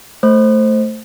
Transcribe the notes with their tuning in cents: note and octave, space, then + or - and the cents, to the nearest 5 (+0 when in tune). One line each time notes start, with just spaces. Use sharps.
A3 +5 C5 +10